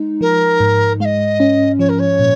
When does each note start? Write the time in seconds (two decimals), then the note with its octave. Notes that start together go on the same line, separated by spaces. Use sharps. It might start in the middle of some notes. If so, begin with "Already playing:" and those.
Already playing: G#3 D#4
0.21 F3 A#4
0.60 G#2
1.00 G#3 D#5 F5
1.40 C#4
1.79 F3 C#5
1.89 A#4
1.99 C#5
2.19 A#2